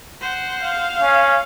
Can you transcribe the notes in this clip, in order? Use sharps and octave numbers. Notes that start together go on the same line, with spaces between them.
C5 F#5
F5
C#4